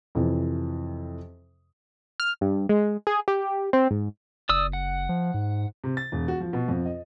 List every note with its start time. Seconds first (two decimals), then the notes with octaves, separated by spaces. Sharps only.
0.15 F2 C3 E3
2.20 F6
2.41 G2
2.69 G#3
3.07 G#4
3.28 G4
3.73 C4
3.91 G#2
4.49 F#1 D5 D#6 E6
4.73 F#5
5.09 F3
5.34 G#2
5.84 C3
5.97 A6
6.12 E1
6.28 F#4
6.40 F3
6.53 B2
6.68 F2
6.86 D#5